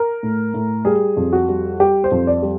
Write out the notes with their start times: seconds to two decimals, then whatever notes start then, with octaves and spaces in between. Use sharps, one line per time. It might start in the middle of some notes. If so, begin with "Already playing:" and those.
Already playing: A#4
0.23 A2
0.54 A2
0.85 G3 G#4
1.17 F2
1.33 F#4
1.49 G3
1.80 G3 G4
2.04 C5
2.11 F2
2.27 D5
2.42 G3